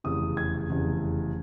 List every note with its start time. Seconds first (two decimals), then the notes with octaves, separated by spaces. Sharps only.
0.04 F1 E2 C#3 D#6
0.37 G#6
0.69 F1 E2 C#3